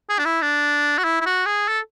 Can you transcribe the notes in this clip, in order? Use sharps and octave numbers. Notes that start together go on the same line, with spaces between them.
G#4
D4
E4
D4
F#4
E4
E4
F#4
G#4
A4